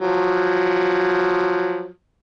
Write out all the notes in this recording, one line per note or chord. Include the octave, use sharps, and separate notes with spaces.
F3 F#3